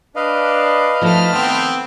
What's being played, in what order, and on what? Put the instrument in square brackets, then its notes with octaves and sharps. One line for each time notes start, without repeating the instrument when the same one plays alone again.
[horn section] D4 [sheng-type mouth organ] B4 D#5 F5
[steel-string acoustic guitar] F3 D#4 E4 [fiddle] A3 F6
[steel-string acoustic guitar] D#3 [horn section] B3 C4